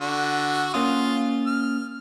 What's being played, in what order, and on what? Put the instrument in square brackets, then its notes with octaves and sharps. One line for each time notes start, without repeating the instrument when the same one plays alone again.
[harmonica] D3 F#4
[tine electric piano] A#3 C#4 D#6 [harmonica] F4
[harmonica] F6